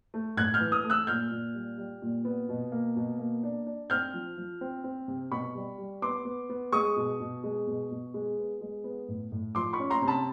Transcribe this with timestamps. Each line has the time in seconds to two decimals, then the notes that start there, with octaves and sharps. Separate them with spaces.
0.14 A3
0.37 A2 F#6 G#6
0.54 F6 G6
0.60 E3
0.72 D#6 F6
0.84 A3
0.90 E6 F#6
1.07 A#2 F6 G6
1.31 A#2
1.55 G3
1.78 G3
2.02 A#2
2.25 B3
2.49 B2
2.72 A#3
2.96 B2
3.19 A#3
3.43 D4
3.67 D4
3.90 C4 F6 G6
4.14 F3
4.37 F3
4.61 C4
4.84 C4
5.08 C3
5.31 B2 B5 C#6
5.55 G3
5.78 G3
6.02 B3 C6 D6
6.25 B3
6.49 B3
6.72 G#3 C#6 D#6
6.96 B2
7.20 B2
7.44 G#3
7.67 B2
7.91 B2
8.14 G#3
8.38 B3
8.61 G#3
8.84 B3
9.08 A2
9.32 A2
9.55 F3 C6 D6
9.73 B5 C#6
9.79 C#4
9.90 A#5 C6
10.02 C3
10.08 A5 B5